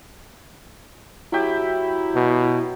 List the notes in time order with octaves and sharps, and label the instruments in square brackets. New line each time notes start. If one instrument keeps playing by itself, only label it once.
[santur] F#3 G4 [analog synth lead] E4
[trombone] B2